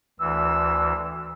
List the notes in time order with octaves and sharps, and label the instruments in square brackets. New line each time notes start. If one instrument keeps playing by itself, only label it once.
[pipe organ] D2 E3 [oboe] E6